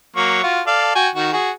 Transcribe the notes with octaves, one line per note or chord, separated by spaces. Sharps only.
F#3 A#3 C#6
F4 F#4
A4 D5 F5
F#4 G5 G#5
D#3 F#4
F#4 G#4